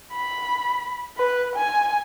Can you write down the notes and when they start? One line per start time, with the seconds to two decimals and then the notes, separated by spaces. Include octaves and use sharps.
0.13 B5
1.17 B4
1.55 G#5